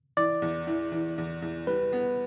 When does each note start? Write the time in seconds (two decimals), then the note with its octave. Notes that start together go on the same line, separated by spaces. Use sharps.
0.17 E3 D5
0.42 E2
0.67 E3
0.92 E3
1.18 E2
1.42 E2
1.67 G3 B4
1.93 B3